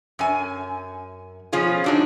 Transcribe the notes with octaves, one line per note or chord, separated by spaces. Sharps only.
F#2 G#5
B2 F3 C#4 F4 G#4
F#3 D4 D#4